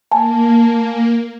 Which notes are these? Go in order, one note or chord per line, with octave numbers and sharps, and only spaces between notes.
A#3 G#5 A5